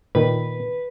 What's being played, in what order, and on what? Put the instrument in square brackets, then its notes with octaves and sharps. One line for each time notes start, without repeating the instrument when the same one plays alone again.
[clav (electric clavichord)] A#2 D#3 [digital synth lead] B4